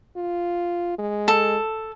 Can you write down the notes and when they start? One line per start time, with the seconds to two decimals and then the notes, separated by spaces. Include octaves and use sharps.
0.17 F4
0.99 G#3
1.28 A4